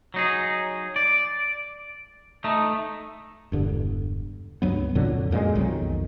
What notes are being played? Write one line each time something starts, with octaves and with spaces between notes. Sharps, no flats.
F#3 D#4 G#4
D5
A3 D#4
E1 G2 D3
C#2 G2 F#3 B3
F2 A#2 D3 F#3
F#2 A#2 G3 G#3
B1 F2 D#3 F#3